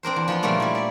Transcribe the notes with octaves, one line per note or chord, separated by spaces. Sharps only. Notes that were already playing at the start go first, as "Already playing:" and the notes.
C4 D4 A#4 C5
E2
F3 B3 F4
A#2 C#3 G3 A3 A#3 F4
G3 E4
D5 E5